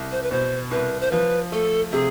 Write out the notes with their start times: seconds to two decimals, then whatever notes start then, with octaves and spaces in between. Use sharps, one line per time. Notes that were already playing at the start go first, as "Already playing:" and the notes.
Already playing: C2
0.11 C5
0.22 B4
0.31 B2 C5
0.71 C2 B4
1.01 C5
1.11 F3 B4
1.52 A3 A4
1.92 C3 G#4